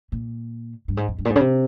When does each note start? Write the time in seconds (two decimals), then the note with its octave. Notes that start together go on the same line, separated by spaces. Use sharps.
0.12 A#2
0.88 G2
0.97 G#2
1.08 F2
1.18 G2
1.25 A#2
1.30 G#2
1.36 C#3
1.40 C3